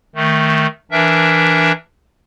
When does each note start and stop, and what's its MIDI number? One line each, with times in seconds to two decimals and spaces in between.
0.16 0.67 51
0.16 0.67 57
0.91 1.72 52
0.91 1.72 62
0.91 1.72 70
0.91 1.72 76